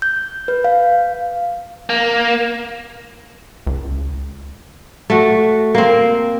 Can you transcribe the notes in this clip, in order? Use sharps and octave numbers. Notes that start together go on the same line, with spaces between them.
G6
B4
F5
A#3
C#2
A3 F#4
A#3 C4